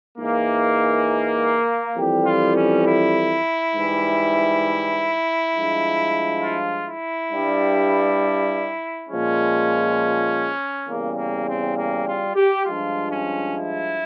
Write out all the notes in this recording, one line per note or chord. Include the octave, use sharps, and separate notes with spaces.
G#2 E3 G#3 A#3
F2 E3 G3 G4
F4
C#4
E4
G#2 E3 G3
G2 F3 G#3
F4
E4
G2 G3
A#2 F3 G#3 C#4
E2 C#3 G3 A#3
A#3
C4
A#3
F4
G4
G2 F3 G#3 F4
C#4
E4